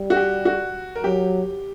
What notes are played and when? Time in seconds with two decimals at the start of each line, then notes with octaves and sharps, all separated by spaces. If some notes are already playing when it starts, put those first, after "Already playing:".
Already playing: G3
0.10 F#4
0.16 G4
0.45 F#4
0.96 A#4
1.04 F#3 G4